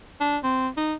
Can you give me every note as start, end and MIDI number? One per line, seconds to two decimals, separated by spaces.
0.21 0.38 62
0.43 0.68 60
0.77 0.94 63